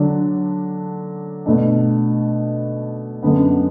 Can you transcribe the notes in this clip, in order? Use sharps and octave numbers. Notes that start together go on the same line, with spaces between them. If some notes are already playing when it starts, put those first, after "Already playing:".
Already playing: D3 F#3 D4
B2 A3 D4
F#2 D3 B3